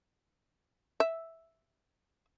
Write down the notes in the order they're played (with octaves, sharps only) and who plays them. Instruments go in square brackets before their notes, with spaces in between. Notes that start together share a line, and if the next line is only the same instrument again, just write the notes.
[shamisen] E5